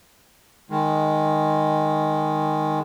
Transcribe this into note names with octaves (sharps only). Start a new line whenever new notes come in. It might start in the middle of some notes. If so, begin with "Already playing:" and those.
D#3 G#3